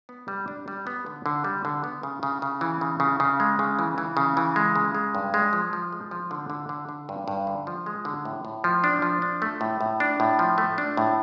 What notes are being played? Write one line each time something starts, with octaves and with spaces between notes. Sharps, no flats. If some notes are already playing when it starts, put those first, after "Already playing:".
B3
G3
D4
G3
B3
D3
D3
G3
D3
B3
C#3
C#3
C#3
E3
C#3
C#3
C#3
G#3
C#3
E3
E3
C#3
E3
G#3
C#3
G#3
G2
G#3
F3
F3
G#3
F3
D3
D3
D3
D3
G2
G2
D3
F3
G#3
D3
A2
A2
F3
D4
F3
D4
A3
A2
A2
D4
A2
F3
A3
D4
A2